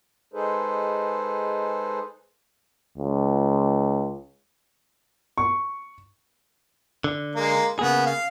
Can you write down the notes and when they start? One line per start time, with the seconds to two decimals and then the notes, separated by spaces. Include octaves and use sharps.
0.34 G#3 D#4 G#4 A4 B4 C5
2.98 C#2
5.38 C#6
7.04 D3
7.36 G#3 A#3
7.79 C#3 A#3 B3 G#4
8.06 F5